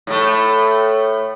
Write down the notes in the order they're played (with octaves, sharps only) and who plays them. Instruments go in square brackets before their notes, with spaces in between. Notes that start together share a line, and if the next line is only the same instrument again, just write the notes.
[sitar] A2 A3